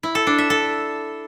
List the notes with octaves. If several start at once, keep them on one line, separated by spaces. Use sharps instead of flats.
E4
A4
D4
E5
A4